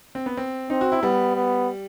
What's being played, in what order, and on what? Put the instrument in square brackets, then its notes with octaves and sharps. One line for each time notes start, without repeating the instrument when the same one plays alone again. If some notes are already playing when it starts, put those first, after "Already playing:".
[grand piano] C4
B3
C4
[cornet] C4 [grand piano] D#4
[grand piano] F#4
E4
[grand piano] G3 [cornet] B3
[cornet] B3